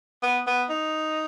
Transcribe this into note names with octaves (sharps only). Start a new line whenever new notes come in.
B3
B3
D#4